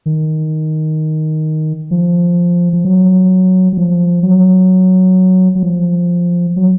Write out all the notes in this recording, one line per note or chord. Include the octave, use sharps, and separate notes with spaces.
D#3
F3
F3
F#3
F#3
F3
F#3
F#3
F3
F#3